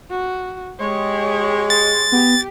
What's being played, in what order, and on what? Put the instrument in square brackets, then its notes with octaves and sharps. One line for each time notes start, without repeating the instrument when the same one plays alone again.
[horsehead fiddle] F#4
[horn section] G#3 [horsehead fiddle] G4 C#5
[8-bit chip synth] A6
[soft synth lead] B3 [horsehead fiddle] G4